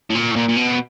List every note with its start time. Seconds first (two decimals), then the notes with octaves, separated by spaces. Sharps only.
0.10 A2
0.15 A#2
0.31 A2
0.36 A#2
0.48 A#2
0.56 B2